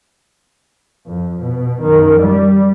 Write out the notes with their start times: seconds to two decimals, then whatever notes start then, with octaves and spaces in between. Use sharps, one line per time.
1.07 F2
1.43 B2
1.81 F#2 D#3
2.21 G3